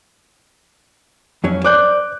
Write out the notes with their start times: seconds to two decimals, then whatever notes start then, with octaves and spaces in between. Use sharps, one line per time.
1.44 F2 F#3 C#4
1.64 C5 D5 D6 F#6 G6